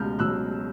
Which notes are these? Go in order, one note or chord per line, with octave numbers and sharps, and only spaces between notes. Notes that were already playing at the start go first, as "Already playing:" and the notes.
Already playing: C#2 B2 F6 G6
B2 F#3 E6 F#6